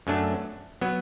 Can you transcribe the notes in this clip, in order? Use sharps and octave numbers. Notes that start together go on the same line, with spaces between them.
F#2 F#3 A3 D4
F#3 B3